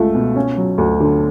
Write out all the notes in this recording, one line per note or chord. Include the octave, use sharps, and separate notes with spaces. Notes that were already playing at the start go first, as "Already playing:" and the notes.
Already playing: C#2 A3
B2
C#4
F#3
D2
D3